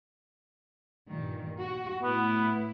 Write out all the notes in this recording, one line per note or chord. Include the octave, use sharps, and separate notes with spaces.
G2 A#2 D#3
F#4
A2 B3 E4